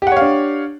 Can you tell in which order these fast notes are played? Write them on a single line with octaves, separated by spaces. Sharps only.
G4 F#5 C#5 F5 D4